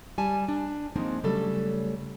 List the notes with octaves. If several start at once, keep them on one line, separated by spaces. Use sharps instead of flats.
G3 G#5 A5
D4
F3 G#3 A#3 C4 D4 D#4
C#3 F#3 G3 A3 A4